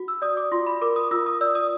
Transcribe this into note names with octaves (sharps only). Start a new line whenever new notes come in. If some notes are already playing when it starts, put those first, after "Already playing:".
Already playing: F#4
E6
D5 D#6
D6
F4 C6
B5
A#4 D6
D#6
F4 E6
D#6
D5 E6
D#6